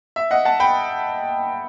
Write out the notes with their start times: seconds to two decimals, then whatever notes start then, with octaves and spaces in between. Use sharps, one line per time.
0.16 E5
0.31 D#5 F#5
0.45 F#5 A5
0.60 G5 B5